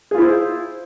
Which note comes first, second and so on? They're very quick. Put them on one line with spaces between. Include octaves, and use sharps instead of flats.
G#4 F4 E4 C5